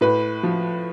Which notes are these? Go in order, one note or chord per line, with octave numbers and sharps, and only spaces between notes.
A2 B4
F3